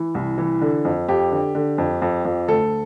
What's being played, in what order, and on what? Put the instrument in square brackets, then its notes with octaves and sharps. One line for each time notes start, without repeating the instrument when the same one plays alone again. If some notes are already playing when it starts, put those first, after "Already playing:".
Already playing: [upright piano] E3
C2
E3
D3
F2
F2 G4
D3
D3
F2
F2
F2
D2 A4